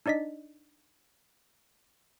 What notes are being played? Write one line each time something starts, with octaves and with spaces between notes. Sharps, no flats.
D4 D#4 D5 D#5 B6